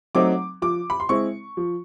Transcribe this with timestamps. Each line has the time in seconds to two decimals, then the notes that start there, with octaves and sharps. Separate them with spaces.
0.15 F#3 A3 C4 D#4 D6
0.62 F3 D6
0.90 B5
1.00 C6
1.09 G#3 C4 E4 C#6
1.57 F3